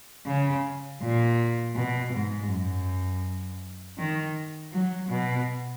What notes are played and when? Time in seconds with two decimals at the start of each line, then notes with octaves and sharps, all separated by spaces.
0.27 C#3
1.02 A#2
1.76 B2
2.13 G#2
2.49 F#2
3.98 D#3
4.73 F#3
5.10 B2